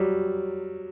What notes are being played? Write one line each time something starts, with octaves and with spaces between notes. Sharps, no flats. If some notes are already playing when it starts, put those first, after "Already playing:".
Already playing: F#3 G3